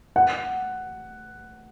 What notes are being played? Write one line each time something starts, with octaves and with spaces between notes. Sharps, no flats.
F#5